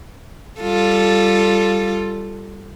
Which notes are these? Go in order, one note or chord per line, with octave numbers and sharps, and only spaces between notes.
G3 F4 A4